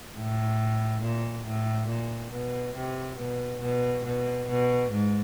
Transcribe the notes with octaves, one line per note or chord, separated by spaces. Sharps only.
A2
A#2
A2
A#2
B2
C3
B2
B2
B2
B2
G#2